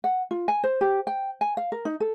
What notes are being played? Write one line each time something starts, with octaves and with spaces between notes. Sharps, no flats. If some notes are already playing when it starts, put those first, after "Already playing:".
F#5
F4
G#5
C5
G4
G5
G#5
F5
A#4
D#4
A4